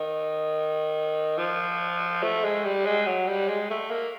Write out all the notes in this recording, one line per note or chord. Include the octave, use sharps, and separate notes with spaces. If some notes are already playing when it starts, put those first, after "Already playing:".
Already playing: D#3
F3
A3
G#3
G3
G#3
F#3
G3
G#3
A3
A#3